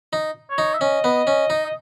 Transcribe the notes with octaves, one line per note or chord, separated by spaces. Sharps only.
D#4
C#5
D#4
E5
C#4 D#5
B3
C#4
D#4
D#5